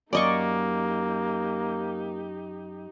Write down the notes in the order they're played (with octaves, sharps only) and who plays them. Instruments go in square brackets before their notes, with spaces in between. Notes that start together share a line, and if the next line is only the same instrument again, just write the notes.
[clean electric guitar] F#2 [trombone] A#3 [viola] D#4 G4 [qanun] D5 D#5 C#6